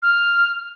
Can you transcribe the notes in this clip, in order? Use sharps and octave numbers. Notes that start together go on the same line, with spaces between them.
F6